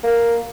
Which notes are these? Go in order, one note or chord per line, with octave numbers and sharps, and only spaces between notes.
A#3